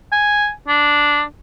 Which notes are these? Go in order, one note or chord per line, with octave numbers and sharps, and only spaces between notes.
G#5
D4